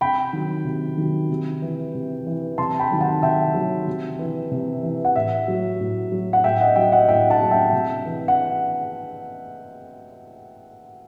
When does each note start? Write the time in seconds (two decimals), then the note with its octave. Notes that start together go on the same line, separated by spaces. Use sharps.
0.01 C3 G5 B5
0.33 D#3 F#3
0.65 C3
0.97 D#3 F#3
1.29 C3
1.62 E3
1.95 C3
2.27 E3
2.58 C3 A5 C6
2.79 G5 B5
2.90 D#3 F#3
3.01 F#5 A5
3.22 C3 E5 G5
3.55 D#3 F#3
3.87 C3
4.19 E3
4.51 C3
4.83 E3
5.05 F#5
5.16 A2 E5
5.48 F#3
5.80 A2
6.12 F#3
6.33 F#5
6.44 A2 E5 G5
6.60 D#5 F#5
6.76 F#3 E5 G5
6.92 D#5 F#5
7.08 A2 E5 G5
7.30 F#5 A5
7.41 F#3
7.51 E5 G5
7.72 C3
8.06 E3
8.28 F#5